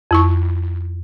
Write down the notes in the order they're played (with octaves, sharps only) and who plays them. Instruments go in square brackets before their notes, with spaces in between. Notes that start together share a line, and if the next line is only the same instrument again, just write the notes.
[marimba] F2 E4 C#6